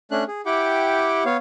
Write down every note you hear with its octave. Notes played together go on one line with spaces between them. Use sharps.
A3 C#4 D4 F#6
G#4
E4 G4 F#5 G5 D6
B3 C#5 F5